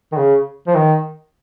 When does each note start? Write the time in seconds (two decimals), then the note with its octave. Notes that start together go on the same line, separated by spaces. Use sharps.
0.12 D#3
0.17 C#3
0.67 F3
0.76 D#3